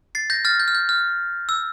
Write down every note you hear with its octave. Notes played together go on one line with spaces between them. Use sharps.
A6 C7
G6 A#6
F6 A6
G6
F6
G6
F6
E6